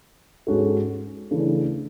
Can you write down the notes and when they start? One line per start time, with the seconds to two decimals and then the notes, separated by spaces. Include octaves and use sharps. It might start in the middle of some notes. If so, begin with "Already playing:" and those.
0.47 G#2 G#3 C#4 F#4 A4
1.31 C#3 E3 A3 D4